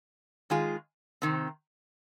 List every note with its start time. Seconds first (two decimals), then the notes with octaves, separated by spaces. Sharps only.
0.50 D#3 G#3 F4 G#4
1.22 C3 D#3 C4